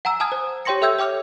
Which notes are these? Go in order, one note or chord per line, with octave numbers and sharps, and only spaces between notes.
F#5 G#5 A#5 E6
G#5 A5 D#6 F6 G#6
C5
G4 C#5 G5 C6 A#6 C#7
A4 E5 G5 E6 G6 G#6
C#5 G5 D6 F6 F7